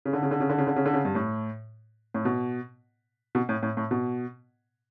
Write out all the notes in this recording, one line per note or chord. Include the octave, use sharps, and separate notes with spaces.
C#3
D3
C#3
D3
C#3
D3
C#3
D3
C#3
D3
C#3
G2
A2
A2
B2
B2
A2
A2
A2
B2